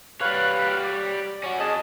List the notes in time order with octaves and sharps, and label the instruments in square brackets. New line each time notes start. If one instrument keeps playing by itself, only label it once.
[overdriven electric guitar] G3 C#5 [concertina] B4 F5 F#6
[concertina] D5
[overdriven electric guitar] C#4 F#4
[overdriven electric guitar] F2 D#5 [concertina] G#4 A5